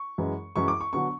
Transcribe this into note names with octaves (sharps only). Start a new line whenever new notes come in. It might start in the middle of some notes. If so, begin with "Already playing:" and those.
Already playing: C#6
F#2 E3 G#3
F#2 E3 G#3 C#6
D6
C#6
D3 F#3 B3 D4 C#6